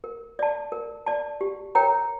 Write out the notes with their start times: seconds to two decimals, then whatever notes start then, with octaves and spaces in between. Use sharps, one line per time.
0.04 A#4
0.39 D5 A5
0.72 A#4
1.06 D5 A5
1.41 G4
1.75 A#4 C#5 G5 A#5